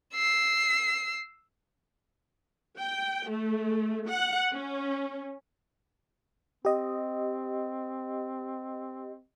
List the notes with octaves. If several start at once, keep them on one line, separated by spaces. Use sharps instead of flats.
E6 C7
G5
A3
F#5
C#4
C4 G4 D#5